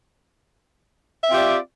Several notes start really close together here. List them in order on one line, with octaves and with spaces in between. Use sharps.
E5 C4 F4 G4 D5